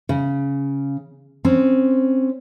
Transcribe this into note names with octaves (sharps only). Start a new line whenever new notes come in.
C#3
C4 C#4